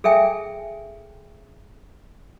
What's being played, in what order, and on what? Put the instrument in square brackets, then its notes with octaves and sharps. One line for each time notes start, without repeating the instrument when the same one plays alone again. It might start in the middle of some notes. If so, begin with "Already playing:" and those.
[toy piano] G#4 A4 E5 G5 G#5